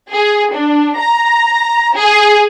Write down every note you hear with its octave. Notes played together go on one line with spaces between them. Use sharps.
G#4
D4
A#5
G#4